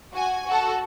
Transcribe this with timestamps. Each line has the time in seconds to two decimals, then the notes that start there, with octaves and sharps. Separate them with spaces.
0.13 F#4 G#5
0.47 F#4 A4